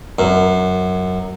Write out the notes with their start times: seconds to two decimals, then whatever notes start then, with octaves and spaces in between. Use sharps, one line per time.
0.19 F#2